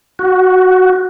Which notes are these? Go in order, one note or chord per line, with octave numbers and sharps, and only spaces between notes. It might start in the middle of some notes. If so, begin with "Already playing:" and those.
F#4